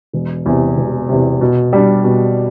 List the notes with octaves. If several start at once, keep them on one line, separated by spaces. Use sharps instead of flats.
E1
E2 C3
E1
E2 C3
B2
G3 D4
B2